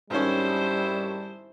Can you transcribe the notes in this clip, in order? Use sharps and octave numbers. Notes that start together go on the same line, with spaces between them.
G#1 D#3 G3 C#4 E4 C5